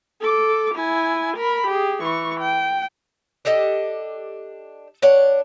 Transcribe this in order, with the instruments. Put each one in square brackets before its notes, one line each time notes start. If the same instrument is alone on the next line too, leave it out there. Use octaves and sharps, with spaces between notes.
[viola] A4 D6
E4 G#5
A#4 B5
G4 G#4
E3 C#6
G5
[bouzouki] D4 G4 A4 D#5
D4 C#5 F#5